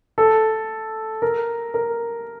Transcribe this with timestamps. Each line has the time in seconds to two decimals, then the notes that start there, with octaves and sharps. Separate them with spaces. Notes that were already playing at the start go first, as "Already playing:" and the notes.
0.18 A4
1.22 A#4
1.74 A#4